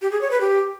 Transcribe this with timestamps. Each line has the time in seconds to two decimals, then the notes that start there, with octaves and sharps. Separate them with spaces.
0.02 G4
0.12 G#4
0.21 C#5
0.31 B4
0.41 G4